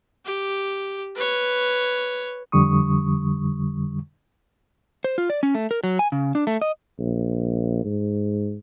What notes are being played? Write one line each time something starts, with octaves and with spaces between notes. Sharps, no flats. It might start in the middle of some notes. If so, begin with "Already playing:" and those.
G4
B4 C#5
F2 D3 G3 C#6 D#6
C5
F4
D5
C#4
A3
A#4
F#3
G#5
C#3
D4
A3
D#5
A#1
G#2